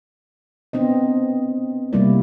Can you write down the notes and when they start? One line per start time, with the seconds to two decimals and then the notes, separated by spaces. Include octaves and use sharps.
0.73 B3 C4 D4 D#5
1.93 C3 G3 A3 A#3 E4 D5